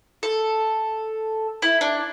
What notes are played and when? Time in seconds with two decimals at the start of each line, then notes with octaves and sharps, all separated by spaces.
0.23 A4
1.62 E4
1.81 D4